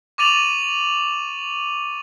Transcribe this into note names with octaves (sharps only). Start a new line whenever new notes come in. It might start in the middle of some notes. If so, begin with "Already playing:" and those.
C#6 D6 A6 D#7 F7 F#7